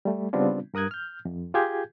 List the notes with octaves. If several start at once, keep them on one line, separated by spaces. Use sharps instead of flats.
G3 A3
C#3 G3 B3 C4 D4 F4
G2 A#4 D#6 F#6 G#6
F6 G6
F2
F4 G4 G#4 G6 G#6